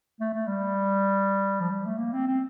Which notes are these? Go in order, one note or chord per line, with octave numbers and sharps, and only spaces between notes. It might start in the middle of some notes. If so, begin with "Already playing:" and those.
A3
A3
G3
F3
G3
A3
A#3
C4
C4